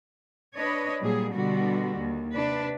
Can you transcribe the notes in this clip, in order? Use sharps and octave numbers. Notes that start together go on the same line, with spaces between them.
D4 B4 C#5 D#5
A#2 F#3 G3 G#4
B2 D3 G3 F#4
D#2
C3 D4 B4